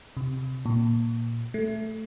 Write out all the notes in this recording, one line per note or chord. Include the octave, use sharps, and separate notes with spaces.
C3
A#2
A3